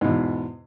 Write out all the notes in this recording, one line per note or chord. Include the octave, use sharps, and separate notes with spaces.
E2 G#2 B2